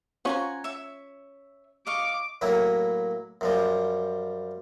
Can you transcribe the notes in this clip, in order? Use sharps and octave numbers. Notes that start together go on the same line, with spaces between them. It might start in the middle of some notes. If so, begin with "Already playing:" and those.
C#4 F4 C5 F#5 G#5 A#5
C#5 E5
D#5 F5 C#6 D6
A2 F#3 A#3 E4
F#2 F3 G3